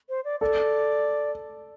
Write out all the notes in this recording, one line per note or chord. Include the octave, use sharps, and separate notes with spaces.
C5
D5
A4 D5